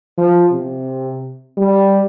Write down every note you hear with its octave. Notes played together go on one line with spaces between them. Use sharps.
F3
C3
G3